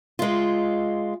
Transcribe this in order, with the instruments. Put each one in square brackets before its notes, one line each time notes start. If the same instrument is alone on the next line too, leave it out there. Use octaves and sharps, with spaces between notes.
[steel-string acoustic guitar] G#3 F4